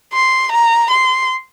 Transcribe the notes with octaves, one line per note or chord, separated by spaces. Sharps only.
C6
A#5
C6